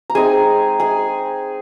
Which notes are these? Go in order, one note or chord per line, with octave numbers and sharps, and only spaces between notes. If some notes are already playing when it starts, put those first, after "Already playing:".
A#5
G#3 C4 D#4 G#4 G#5
G#4 G#5